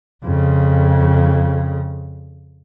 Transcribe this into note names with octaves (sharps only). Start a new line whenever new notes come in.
F2 C#3